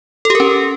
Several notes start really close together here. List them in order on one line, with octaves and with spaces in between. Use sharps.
A4 G4 A#4 C#4